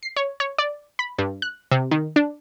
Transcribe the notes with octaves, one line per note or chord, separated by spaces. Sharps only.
C7
C#5
C#5
D5
B5
G2
F#6
C3
D#3
D4